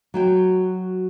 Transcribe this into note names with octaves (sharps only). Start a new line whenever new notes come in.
F#3 F#4 G5